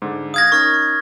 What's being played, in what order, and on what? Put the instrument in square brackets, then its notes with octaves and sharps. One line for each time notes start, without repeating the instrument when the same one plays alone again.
[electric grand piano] G#2 D3
[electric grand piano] F5 F6 F#6 [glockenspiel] D#6 G#6 A#6
[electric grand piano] C#4 D#4 A#4 [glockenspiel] C#6 F6 A#6